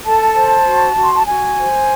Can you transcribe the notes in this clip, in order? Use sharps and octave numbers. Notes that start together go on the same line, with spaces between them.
A4 A5
C5
F#4
F#4
C6
A5
F#4 G#5
C5